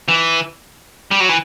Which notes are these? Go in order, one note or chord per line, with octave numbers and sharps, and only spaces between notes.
E3
G3
F#3
E3